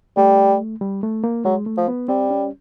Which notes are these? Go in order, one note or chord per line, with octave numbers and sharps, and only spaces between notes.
G3 A3
G3
A3
A#3
F#3 G#3
A3
F3
B3
G3 C4
C#4